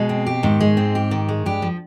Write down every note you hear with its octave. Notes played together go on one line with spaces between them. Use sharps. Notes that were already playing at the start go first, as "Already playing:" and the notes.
Already playing: B2 G#3
C4
G4
G#2 D#3
G#3
C4
G4
D#3
G#3
G2 G4
F3